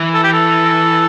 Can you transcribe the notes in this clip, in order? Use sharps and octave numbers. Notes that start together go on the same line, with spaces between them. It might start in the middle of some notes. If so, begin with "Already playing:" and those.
Already playing: E3
A4
G4
A4